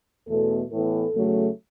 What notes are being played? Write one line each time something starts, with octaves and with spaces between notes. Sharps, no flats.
E2 B2 A3 A4
A2 E3 B3 A4
E2 C#3 F#3 A3